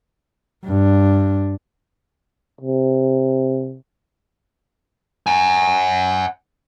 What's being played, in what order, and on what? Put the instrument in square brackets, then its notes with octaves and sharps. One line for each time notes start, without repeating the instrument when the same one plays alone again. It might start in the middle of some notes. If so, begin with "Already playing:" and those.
[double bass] G2 D4
[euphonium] C3
[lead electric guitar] F#5 G#5